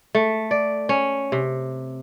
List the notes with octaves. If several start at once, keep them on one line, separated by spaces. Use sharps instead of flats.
A3
D5
C#4
C3